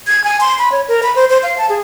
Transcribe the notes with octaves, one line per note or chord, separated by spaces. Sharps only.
G#6
G#5
C6
B5
C#5
A#4
B5
C5
C5
F5
A5
G#4